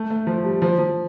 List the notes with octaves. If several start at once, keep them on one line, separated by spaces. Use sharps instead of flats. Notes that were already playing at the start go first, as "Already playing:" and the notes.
Already playing: A3
A3
F3
G3
F3
F3